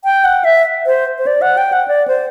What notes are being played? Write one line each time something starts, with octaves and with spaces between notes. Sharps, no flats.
G5
F#5
E5
C5
C5
D5
F#5
G5
F#5
D5
C5